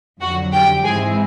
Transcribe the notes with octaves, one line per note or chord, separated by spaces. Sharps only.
F2 D3 F#3 F#4 F#5
G4 G5
G#2 E3 G#3 C4 E4 G#4 G#5